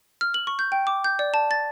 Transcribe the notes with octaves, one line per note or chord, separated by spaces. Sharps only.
F6
F#7
C#6
G6
G5
D6
G6
D5
A5
A6